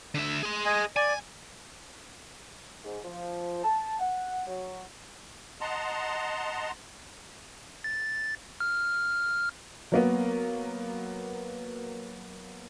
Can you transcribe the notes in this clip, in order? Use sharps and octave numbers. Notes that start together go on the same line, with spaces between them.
D3 E5
G#4 C6
D#5 G#5
D5 G#5
G#2
F3
A5
F#5
F#3
D#5 F#5 A5 A#5 C6
A6
F6
F#3 A#3 B3